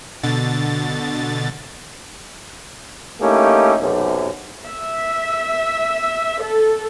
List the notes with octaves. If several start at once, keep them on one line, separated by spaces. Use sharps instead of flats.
B2 D3 A6
A3 A#3 C#4 D#4 E4 G4
B1 F#2 C3
E5
A4